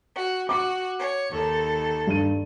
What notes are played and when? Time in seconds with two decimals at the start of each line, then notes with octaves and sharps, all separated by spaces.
0.14 F#4
0.49 F#4 D6
0.97 C#5
1.33 D#2 D#3 A4
2.07 G2 D#7